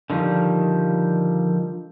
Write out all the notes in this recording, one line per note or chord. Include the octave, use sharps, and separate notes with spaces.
D3 D#3 F3 G3